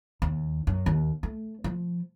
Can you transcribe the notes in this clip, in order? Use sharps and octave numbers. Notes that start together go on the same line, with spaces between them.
D#2
F#2
D#2
A3
F3